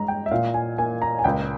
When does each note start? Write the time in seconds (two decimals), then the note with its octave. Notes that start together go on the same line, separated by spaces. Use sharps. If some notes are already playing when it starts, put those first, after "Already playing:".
Already playing: G2 G#3 A#5
0.08 G5
0.26 E5
0.31 A#2 F5
0.54 G#5
0.78 A#3 G#5
1.02 A#5
1.19 G#5
1.24 C#2 G5